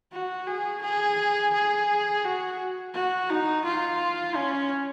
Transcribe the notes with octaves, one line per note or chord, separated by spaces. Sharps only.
F#4
G#4
G#4
G#4
F#4
F#4
D#4
F4
C#4